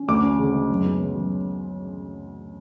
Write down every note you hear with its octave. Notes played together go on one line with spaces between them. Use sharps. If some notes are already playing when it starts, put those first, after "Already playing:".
Already playing: C#4
D2 D6
C#4
C#3
G#3
F#2
B3
C#3
F#3